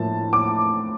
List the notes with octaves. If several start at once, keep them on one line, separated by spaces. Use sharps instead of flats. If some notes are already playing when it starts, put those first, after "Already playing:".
Already playing: A2 F3 A#3 A5
D6